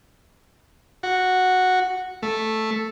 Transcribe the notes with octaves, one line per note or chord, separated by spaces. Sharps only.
F#4
A3